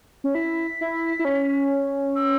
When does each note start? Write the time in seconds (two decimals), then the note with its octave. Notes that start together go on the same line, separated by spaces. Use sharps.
0.24 C#4
0.35 E4 B6
0.81 E4
1.19 E4
1.25 C#4
2.16 E6